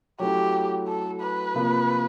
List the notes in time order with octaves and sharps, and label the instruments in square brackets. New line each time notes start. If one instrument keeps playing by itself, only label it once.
[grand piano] F#3 A3 C#4 E4 [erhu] G4
[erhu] A4
B4
[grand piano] C3 F3 A#3